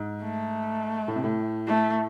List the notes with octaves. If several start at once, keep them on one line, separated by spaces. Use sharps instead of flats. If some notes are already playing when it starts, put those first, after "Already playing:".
Already playing: G#2
A3
A2
C3
A2
A3